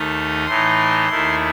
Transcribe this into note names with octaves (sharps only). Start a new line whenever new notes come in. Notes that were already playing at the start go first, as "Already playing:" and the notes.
Already playing: D#2 D#3 A3 D#4 D#6
A2 E3 A3 D#4 C6
D#2 D#3 A3 E4